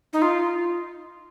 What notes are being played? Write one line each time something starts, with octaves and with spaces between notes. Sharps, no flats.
D#4
F4